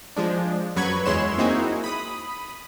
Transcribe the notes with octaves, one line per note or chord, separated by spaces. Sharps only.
F3 G#3 D4
F#2 F#3 B4 B5 C#6 G#6
E2 G#3 E4 C#5 C6 E7
A#3 C4 D#4 E4 F#4 G#4
B5 D#6